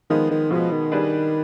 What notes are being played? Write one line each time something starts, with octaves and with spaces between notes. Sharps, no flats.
D#3 F3 G#3 B3
D#3
B2 F3 G#3 B3
D#3
G3 D4 G#4 B4